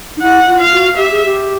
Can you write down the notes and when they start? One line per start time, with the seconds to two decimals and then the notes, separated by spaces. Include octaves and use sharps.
0.17 D#4
0.22 E4 F#5
0.47 F4
0.60 F5
0.72 F#4
0.97 G4 E5
1.11 G#4
1.25 G4